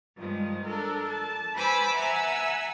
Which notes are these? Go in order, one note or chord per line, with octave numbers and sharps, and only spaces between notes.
G2 D#3 F3 G#3
D4 A4 A#4
A5
B4 C5 G#5 B5 D6 E6
E5 F#5 G#5 A#5 E6